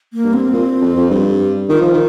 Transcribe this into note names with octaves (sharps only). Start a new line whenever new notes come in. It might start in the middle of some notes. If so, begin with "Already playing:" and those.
A#3
G2
C4
A#2
F2
F2
G2
D#3 F4
F3
D#3